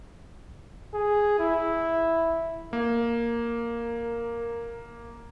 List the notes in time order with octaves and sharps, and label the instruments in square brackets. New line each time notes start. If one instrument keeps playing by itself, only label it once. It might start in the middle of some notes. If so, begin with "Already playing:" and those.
[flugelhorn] G#4
E4
[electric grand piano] A#3 [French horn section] A#4